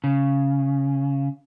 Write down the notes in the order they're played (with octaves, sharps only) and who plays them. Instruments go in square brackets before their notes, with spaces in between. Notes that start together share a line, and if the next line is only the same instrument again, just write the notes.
[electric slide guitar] C#3